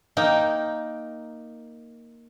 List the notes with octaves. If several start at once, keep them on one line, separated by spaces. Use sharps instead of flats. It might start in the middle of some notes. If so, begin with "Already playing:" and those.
A#3 D#4 G5